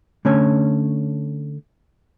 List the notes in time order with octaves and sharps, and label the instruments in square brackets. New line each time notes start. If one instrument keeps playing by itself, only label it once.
[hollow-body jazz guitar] D3 A3 C#4 C#5